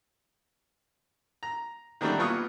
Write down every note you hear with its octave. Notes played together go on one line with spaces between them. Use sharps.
A#5
D3 D#3 F#3 G3 A3 D4
A#1 A#2 B3 F4 C#6 D#6